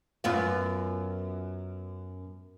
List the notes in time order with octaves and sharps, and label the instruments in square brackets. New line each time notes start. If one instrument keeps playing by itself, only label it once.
[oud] F#2 B3 F4